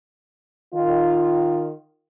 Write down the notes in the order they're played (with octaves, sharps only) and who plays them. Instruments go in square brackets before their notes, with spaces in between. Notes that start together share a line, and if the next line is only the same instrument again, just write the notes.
[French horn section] D#3 F4